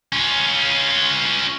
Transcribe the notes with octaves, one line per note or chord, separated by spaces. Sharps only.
C#4 F4